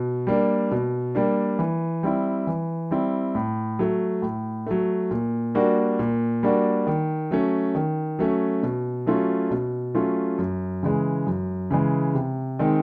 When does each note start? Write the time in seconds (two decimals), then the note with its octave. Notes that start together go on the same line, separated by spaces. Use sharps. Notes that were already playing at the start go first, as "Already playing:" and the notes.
Already playing: B2
0.27 G3 A#3 D4
0.71 B2
1.15 G3 A#3 D4
1.59 E3
2.03 G3 C4 E4
2.47 E3
2.91 G3 C4 E4
3.35 A2
3.79 F#3 A3
4.22 A2
4.67 F#3 A3
5.11 A#2
5.55 G3 A#3 D4 F#4
5.99 A#2
6.43 G3 A#3 D4 F#4
6.87 D#3
7.31 F#3 A3 C#4
7.75 D#3
8.19 F#3 A3 C#4
8.63 B2
9.06 F#3 A3 C#4 F4
9.51 B2
9.95 F#3 A3 C#4 F4
10.38 F#2
10.83 C#3 E3 G#3
11.27 F#2
11.71 C#3 E3 G#3
12.14 C3
12.59 D#3 G#3 C4 D#4